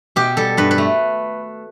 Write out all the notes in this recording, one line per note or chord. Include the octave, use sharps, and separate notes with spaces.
B2 G4
G3 A4
G2 B4
B4
A3